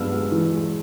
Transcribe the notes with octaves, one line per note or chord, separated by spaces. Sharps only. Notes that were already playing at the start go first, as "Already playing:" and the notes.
Already playing: G2 G#3 B3 E6 F6
G#3
E3
G#3